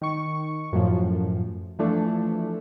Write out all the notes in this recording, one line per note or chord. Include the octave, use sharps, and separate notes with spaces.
D#3 C#6
F#2 A2 F3
E3 F3 A3 D4